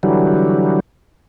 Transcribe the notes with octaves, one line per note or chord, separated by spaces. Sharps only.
D3 E3 F#3 G3